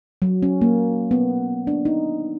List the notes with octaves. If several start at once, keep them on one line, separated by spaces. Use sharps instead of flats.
F#3
C#4
A#3
B3
D4
D#4